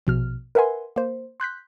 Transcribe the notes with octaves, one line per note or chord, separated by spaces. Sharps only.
A#1 B2 F6
A#4 B4 E5 F#5 G#5 C6
A#3 C5
C6 F#6 G6 B6